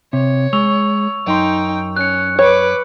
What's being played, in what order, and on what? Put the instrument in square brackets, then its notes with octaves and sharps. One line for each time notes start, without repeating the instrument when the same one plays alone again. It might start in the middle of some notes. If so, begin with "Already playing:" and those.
[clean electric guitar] C3 [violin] C#5
[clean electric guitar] G#3 [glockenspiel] C#6 E6 F7
[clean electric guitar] F#2 C6 [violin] D#4 G5
[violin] C#4 [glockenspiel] F#6 C#7
[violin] B4 D6 [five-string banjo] C#5